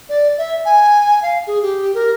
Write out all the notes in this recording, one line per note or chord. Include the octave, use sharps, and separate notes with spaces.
D5
E5
G#5
F5
G#4
G4
A#4